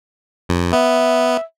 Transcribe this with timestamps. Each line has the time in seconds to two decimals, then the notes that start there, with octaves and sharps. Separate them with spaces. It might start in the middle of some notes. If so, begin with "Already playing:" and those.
0.49 F2
0.73 B3 E5